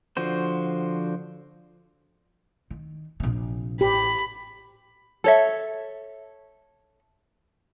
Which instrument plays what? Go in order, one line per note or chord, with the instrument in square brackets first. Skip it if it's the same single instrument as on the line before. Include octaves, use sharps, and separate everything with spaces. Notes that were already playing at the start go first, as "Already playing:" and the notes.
[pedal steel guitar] D3 F3 F#4 C5
[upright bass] D#3
A#1 C3
[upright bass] A1 [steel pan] G4 [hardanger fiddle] B5
[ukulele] A4 C#5 E5